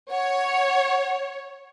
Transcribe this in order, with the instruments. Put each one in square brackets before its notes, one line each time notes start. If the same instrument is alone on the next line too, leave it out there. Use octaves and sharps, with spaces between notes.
[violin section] C#5 [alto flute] F#5